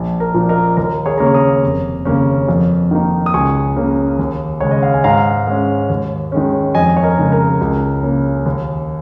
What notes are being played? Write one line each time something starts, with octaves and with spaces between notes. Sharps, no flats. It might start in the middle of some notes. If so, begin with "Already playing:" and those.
Already playing: A#1
A#4
A#2 F3
A#4 D#5
D#2 A#4
G#4 C#5
C#3 A#3 C#4 A#5
C#6
A#5 D#6
F1
D#2 C#3 A#3 C#4
F2
D#3 A#3 D#4
D#6
C#2 G#5 C#6
C#3 A#3 C#4
D#2
C#3 G#3 C#5
D#5
F5
G#5
G#2 F5 A#5
G#3 C#4
D#2
D#3 G#3 C#4
F2 D#5 G#5
C#5
A#4 D#5
C#3 G#3 D#4
A#4
C#2
C#3 A#3
D#2